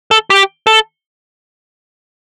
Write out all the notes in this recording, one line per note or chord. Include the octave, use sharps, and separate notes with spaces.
A4
G4
A4